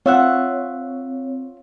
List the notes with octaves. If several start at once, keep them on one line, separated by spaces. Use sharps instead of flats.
C4 F4 C#5 E5 F#5